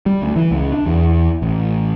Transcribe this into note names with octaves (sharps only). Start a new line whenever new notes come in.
G3
D2
E3
C#2
D4
E2
A1